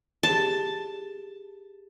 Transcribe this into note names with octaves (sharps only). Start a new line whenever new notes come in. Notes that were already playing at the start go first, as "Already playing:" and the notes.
G4 G#4 A5